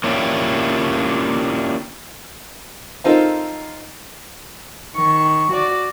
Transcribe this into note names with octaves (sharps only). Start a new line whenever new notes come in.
A#3 C#4 D4 E4 F4 G4
C4 D#4 F4 A4 A#4
D#3 C#6
F#4 D5